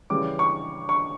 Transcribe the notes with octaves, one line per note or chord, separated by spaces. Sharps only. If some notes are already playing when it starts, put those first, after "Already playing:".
C#3 E3 G3 D6
C#6
C#6